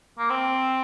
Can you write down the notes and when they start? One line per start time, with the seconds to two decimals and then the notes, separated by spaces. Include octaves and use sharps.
0.18 A#3
0.30 C4